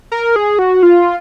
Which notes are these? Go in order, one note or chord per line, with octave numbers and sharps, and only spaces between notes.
A#4
G#4
F#4
F4